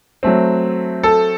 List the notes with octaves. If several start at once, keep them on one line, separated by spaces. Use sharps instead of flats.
F#3 A3 C4
A4